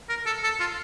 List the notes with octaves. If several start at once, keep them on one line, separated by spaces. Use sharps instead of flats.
A#4
A4
A4
F4